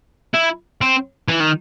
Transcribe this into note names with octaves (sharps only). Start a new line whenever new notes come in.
E4
C4
E3
D#3